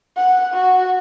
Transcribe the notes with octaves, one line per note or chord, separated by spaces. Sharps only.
F#5
F#4